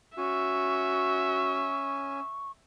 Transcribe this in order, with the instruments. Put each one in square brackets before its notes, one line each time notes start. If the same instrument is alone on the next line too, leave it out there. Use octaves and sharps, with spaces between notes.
[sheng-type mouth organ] C#4 G#5 [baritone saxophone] F#4 [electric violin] E5 [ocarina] C#6